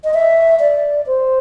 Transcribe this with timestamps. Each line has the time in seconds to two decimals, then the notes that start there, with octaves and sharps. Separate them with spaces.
0.04 D#5
0.14 E5
0.60 D5
1.06 C5